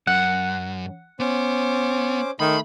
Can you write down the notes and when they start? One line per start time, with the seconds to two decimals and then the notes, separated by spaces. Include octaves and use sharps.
0.07 F#2 F#5
1.20 B3 C#4 C5 D6
2.40 D#3 A3 B5 C6